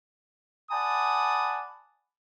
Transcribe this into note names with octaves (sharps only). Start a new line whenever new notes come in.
D5 F#5 G#5 A5 B5 D#6